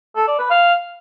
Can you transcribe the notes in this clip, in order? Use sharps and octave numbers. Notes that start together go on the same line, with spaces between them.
A4
D5
B4
F5